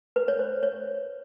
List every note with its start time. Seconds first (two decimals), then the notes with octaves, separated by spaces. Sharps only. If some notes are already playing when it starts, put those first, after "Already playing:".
0.16 B4
0.28 C#5
0.39 C5
0.63 C#5